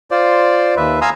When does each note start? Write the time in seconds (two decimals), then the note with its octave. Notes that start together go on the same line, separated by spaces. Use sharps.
0.11 F4 C5 D5
0.77 D#2 B4 E5
1.01 F5 G#5 A#5 C6 D#6 E6